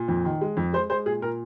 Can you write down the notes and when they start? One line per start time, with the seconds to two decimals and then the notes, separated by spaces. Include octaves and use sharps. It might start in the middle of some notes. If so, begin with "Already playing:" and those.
Already playing: A#2
0.08 F2
0.25 D#3
0.41 G#3
0.57 F2
0.73 G#3 C5
0.90 G#3 C5
1.06 A#2 G#4
1.22 A#2 A#4